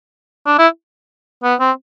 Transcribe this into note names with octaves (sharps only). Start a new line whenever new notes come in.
D4
E4
B3
C4